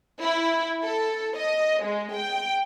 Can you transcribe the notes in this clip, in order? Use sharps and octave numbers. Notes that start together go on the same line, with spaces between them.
E4
A4
D#5
G#3
G5